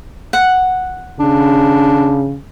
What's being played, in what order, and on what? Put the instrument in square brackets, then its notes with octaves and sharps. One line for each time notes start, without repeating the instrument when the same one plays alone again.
[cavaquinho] F#5
[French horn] C#3 [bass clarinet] D4